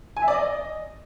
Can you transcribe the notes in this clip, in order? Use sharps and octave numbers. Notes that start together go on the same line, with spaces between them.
G#5
E5
D5
D#5